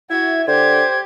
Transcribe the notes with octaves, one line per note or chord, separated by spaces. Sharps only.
E4 F#4 E5 G#6
D3 G4 C5 G#6